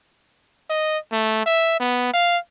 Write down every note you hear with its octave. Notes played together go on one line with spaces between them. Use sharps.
D#5
A3
E5
B3
F5